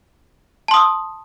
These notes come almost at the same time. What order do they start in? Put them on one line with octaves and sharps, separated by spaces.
A5 C6 D#6 E6